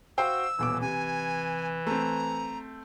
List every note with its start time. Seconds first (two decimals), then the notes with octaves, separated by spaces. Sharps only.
0.18 F#4 C5 F5 G5 E6
0.59 D#1 B2 E3 D6
0.81 C3 G#5
1.87 A3 C4 A#5